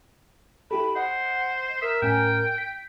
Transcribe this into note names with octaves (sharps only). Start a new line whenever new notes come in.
E4 G4 A4 B5
C5 D#5 F#5
A#4 E5 D#6
A2 C#4 G5 G#5
B6